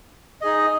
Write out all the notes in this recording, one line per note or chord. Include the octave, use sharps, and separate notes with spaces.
D#4 G#4 D#5